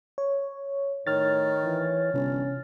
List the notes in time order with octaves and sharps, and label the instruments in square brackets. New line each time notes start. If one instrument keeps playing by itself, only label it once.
[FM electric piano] C#5
[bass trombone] A2 [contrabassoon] D#3 [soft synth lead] C#5 [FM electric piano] F6 A6
[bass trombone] E3
[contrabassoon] G1 [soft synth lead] C3 [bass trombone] C#4